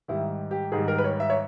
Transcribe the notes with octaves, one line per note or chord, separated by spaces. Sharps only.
G#2 D#3 G3 E4
G4
G#2 D#3 G3 G#4
A#4
B4
C#5
E5
C#5